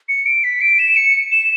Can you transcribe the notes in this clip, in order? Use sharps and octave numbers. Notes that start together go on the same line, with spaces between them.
C#7
D7
B6
D7
E7
C#7
E7